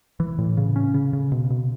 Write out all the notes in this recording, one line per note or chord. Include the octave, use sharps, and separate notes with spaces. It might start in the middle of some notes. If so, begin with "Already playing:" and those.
E3
A2
C#3
C#4
C#3
C#3
B2
B2